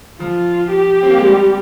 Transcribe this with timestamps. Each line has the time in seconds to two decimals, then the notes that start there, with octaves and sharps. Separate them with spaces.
0.20 F3 F4
0.72 G4
1.03 C4
1.10 A#3
1.18 G#3
1.25 G3